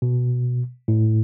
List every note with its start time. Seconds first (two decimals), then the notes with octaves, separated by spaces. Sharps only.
0.02 B2
0.88 A2